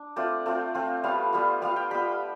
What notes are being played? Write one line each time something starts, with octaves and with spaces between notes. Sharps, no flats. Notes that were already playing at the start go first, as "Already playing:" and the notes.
Already playing: D4
A3 C4 F4 D5
A3 C4 F4
A3 C4 F4
G3 B3 F4 F5
G3 B3 F4
G3 B3 F4 F5
G5
G3 B3 F4 B5